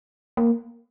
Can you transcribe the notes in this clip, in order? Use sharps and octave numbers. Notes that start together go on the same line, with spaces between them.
A#3